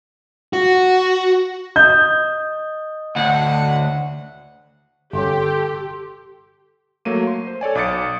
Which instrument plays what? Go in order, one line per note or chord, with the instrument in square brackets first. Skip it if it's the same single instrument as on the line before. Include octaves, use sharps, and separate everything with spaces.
[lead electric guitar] F#4
[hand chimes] D#5 D#6 [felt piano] G6
[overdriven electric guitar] D2 [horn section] A2 F#5
[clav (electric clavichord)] G1 C#4 [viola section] G4 [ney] A4 [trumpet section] C6
[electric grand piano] F#3 A3 A#3 D#7
C6
C5
A4 C#5 D5 G#5
B1 D6 D#6 A6 C#7